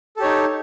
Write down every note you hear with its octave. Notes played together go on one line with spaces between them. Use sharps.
D#4 G4 A4 C#5